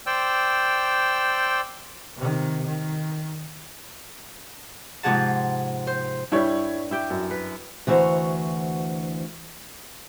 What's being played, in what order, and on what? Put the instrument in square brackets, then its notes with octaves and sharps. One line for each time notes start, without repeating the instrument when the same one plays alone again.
[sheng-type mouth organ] C5 D5 G5 E6
[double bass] C3 D#3
D#3
[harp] G#2 C3 F3 G#4 F#5 A5
C5
[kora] G2 G3 [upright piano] E4 C#5
[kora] E4 G4 G5
[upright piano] F#2
[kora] B4
[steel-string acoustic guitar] D2 E3 E4 F#4 C5 A#5